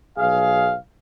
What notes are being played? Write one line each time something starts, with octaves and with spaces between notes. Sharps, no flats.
B1 G#4 F5